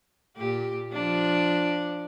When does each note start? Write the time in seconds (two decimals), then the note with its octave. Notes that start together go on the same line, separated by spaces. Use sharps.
0.37 A#2 G4
0.93 F3 D4